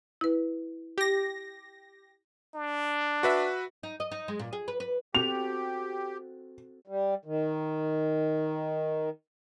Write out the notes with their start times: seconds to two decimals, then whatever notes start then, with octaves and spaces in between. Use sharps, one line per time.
0.21 E4 B4
0.98 G4 A#6
2.55 D4
3.23 F#4 B4 E5
3.83 D#4
4.00 D#5
4.11 D#4
4.28 G#3
4.39 A#2
4.53 G#4
4.68 B4
4.80 B4
5.15 C4 F#4 G4 A4 F7
6.88 G3
7.25 D#3